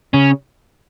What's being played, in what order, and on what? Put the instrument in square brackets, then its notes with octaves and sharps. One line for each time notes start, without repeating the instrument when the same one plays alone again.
[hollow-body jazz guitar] C#3 [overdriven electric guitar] C#4